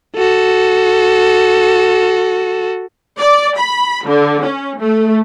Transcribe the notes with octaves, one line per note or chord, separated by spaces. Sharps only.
F#4 A4
D5
B5
D3
C#4
A3